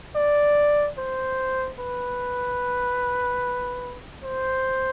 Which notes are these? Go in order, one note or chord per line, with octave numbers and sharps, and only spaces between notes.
D5
C5
B4
C5